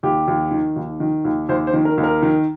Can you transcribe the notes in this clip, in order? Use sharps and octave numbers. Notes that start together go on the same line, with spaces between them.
D#2 G4
D#2
D#3
D#2
D#3
D#2
D#2 C5
C5
D#3
A#4
D#2
A#4
D#3